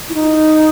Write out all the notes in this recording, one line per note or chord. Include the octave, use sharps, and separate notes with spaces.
E4
D#4